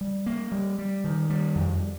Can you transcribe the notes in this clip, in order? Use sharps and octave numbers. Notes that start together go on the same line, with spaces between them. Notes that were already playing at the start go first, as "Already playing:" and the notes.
G3
A#3
G3
G3
D#3
G3
F2